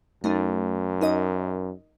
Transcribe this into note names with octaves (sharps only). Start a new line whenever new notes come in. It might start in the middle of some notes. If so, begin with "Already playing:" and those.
F#2 A3 D#4
D#4 A#4 D#5